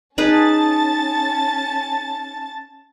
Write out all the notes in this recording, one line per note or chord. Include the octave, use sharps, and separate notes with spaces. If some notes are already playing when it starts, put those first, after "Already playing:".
C#4 D#4 G#4 B4 A5 A6